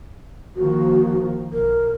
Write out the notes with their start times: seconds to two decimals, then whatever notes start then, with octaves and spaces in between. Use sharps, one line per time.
0.56 D#3 F3 A#3 F#4
1.52 B1 A#4